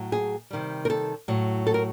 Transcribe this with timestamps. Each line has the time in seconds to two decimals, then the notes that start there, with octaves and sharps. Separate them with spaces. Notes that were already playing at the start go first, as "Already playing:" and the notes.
Already playing: A2 F#3
0.12 G#4
0.50 C3 D#3 G3
0.85 A#4
0.90 A4
1.28 A2 F#3
1.67 A4
1.74 A#4